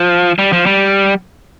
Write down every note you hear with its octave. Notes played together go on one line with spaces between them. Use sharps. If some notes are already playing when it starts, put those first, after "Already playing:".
Already playing: F3
G3
F3
G3